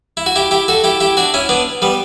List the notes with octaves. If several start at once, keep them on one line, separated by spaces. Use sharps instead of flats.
E4
F#4
E4 G4
E4 G4
F#4 A4
E4 G4
E4 G4
D4 F#4
C#4 E4
B3 D4
G3 B3